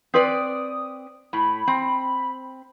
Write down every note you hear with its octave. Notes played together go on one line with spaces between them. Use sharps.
C4 B4 D5 D#6
A2 B5
C4